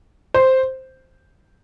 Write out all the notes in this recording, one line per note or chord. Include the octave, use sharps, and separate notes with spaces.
C5